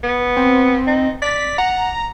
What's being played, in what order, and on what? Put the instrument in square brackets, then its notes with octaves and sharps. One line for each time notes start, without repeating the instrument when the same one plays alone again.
[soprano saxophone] B3
[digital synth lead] C4
[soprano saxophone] D#4
[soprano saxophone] D5 [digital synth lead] B6
[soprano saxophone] F#5 [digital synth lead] A#5